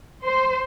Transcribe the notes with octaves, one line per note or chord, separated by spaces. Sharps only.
C5